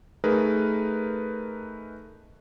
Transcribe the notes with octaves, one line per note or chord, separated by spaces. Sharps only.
A3 D#4 G#4 A#4 B4